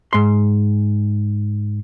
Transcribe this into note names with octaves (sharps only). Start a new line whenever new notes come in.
G#2 C6